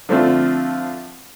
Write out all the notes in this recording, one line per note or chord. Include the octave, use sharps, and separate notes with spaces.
D3 F3 A3 C4